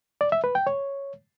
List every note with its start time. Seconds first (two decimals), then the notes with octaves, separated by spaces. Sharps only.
0.21 D5
0.32 E5
0.44 B4
0.55 G5
0.67 C#5